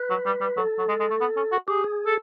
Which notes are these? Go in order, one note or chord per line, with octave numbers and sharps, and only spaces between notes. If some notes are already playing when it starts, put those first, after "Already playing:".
Already playing: B4
F#3
G3
G3
F#3 A4
F#3
G#3
G#3
A3
B3
C#4
F#4
G4 G#4
G#4
A4